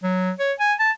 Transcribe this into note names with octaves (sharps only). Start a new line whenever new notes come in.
F#3
C#5
G#5
A5